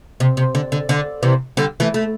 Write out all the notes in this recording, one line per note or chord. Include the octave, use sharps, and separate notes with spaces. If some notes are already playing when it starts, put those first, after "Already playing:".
C3
C3
D3
D3
D3
C3 E3
D3 G3
E3 A3
A3